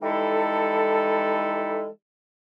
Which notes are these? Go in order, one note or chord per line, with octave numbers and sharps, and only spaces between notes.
E3 G3 G#3 D#4 E4 A4